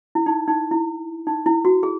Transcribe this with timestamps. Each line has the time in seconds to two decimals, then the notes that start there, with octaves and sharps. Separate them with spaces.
0.15 E4
0.26 D#4
0.48 D#4
0.71 E4
1.27 D#4
1.46 E4
1.65 F#4
1.83 G#4